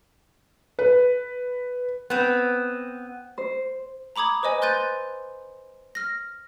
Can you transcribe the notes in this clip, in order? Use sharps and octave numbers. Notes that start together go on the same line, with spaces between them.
B4
B3 C4
C5
A#5 B5 D6 D#6 G#6
B4 C5 D#5 G#5
C6 F#6 G6 A6 D#7
F6 A#6